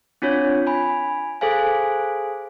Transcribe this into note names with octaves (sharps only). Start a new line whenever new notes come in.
C4 D4 F4 C#5
G#5 B5
G#4 A4 C5 F5 G#5